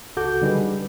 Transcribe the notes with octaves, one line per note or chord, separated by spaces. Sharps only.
C#2 F#4 A4 D6 G6
D3 G3 D#4 G#4 B4